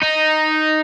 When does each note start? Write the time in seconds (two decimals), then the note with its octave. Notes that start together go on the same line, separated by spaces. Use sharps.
0.03 D#4